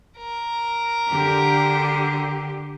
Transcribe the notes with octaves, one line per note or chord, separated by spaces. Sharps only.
A#4
D3 G4